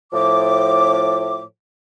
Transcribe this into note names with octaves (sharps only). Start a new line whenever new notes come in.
A2 F3 D6